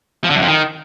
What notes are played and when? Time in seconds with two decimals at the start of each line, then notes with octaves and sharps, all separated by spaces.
0.24 F3
0.30 D3
0.36 F#2
0.42 F2
0.48 D#3